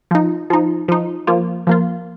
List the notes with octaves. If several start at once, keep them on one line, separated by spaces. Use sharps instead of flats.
F3 D#4
F3 D#4
F3 D#4
F3 A#3 F4
F3 A#3 F4